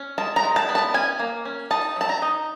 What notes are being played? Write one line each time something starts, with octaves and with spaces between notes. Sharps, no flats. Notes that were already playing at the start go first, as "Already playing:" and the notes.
Already playing: C#4
G#3 A5
A#5
G#3
A5
B3
A5
C#4 G#5
A#3
C#4
D#4 A5
F#3 A5
A#5
D#4